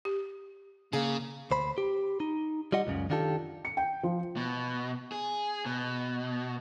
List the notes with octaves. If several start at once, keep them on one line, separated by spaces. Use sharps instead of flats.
G4
C#3 A#3 G#4
D2 C5 B5
G4
D#4
G3 F4 D#5 F#5
C#2 F#2 C#3
D#3 D4 F4 G4 A4
C#7
G5
F3
B2
G#4
B2